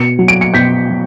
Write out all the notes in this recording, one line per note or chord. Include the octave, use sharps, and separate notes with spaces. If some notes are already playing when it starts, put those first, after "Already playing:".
Already playing: B2 C#7
F#3
D7
C#7
B2 G6 B6
F#3